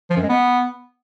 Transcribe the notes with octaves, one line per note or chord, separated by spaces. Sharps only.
F3
F#2
G#3
B3